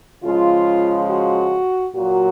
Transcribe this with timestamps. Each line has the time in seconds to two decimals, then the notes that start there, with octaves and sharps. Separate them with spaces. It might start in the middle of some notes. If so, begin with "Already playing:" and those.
0.23 C#3 F3 G#3 F4
1.10 F#4
1.96 A#2 F#3 F#4